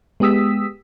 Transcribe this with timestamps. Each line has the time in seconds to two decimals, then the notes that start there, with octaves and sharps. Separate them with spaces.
0.20 G#3 B3 G4 D#6 E6 B6